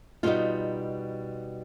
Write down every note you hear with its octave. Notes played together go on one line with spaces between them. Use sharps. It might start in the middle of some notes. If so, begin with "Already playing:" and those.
B2 G3 B3 D#4 F4